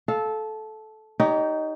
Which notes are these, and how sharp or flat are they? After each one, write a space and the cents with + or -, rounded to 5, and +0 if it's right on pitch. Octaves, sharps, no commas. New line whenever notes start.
A4 -15 F5 +0
D#4 +0 G4 +0 C#5 +40